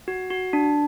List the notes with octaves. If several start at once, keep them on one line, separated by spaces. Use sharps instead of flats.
F#4
F#4
D4